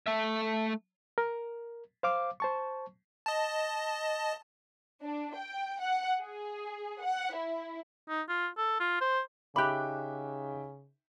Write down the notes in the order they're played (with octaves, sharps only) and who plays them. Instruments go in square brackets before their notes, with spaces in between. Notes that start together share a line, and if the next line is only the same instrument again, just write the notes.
[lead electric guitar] A3 E5
[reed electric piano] A#4
C5 F5 D6
C5 A5 C#6
[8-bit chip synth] D#5 A5
[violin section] D4
G5
F#5
G#4
F#5
E4
[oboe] D#4
F4
A4
F4
C5
[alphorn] C#3 [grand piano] D#4 E5 G5 [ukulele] G4 B5 [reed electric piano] D6 F#6